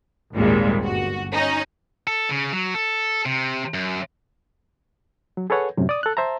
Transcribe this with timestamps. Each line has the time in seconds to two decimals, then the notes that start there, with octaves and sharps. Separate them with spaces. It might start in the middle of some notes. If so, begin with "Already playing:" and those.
0.35 G#1 D#2 A#2 G3 G#3
0.81 G1 F#4
1.33 C#4 D#4
2.07 A4
2.30 C#3
2.53 F#3
2.74 A4
3.25 C3
3.74 F#2
5.37 F#3
5.50 G#4 A4 B4 C#5 F#5
5.77 F#2 A2 C3
5.89 D5 D#6
6.03 A4 F#6
6.17 C5 E5 A5 A#5